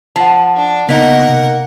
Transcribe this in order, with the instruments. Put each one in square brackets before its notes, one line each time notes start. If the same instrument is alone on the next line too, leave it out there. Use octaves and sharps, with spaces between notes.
[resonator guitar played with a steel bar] F3 [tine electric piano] F#5 A5
[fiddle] D4
[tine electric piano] C#3 B3 B6 [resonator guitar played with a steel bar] A#3 D#4 [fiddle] A#4 F#5
[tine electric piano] C3